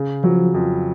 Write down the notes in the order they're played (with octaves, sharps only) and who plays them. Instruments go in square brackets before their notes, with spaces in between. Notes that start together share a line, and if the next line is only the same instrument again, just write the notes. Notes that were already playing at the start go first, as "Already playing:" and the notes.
Already playing: [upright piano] C#3
[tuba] F3 [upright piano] F#3
[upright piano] F2